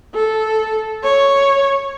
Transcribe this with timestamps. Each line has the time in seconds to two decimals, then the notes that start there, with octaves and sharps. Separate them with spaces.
0.15 A4
1.04 C#5